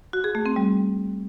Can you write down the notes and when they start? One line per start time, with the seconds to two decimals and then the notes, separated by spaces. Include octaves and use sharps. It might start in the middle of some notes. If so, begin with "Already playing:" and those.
0.13 F#4
0.24 G#4
0.35 A3
0.46 C4
0.56 G3